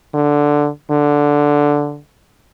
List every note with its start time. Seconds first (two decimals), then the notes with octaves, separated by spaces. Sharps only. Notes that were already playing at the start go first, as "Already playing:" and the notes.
0.15 D3
0.91 D3